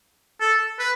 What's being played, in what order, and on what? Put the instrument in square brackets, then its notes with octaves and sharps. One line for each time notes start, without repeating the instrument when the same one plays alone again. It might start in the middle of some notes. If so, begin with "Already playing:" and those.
[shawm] A4
B4